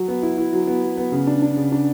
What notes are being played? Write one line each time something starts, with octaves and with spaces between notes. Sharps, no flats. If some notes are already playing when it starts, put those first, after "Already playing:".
Already playing: F#3
B3
E4
E4
F#3
B3
F#3
B3
C#3
D4
D4
C#3
D4